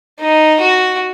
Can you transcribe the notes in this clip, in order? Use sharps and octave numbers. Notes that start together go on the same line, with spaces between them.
D#4
F#4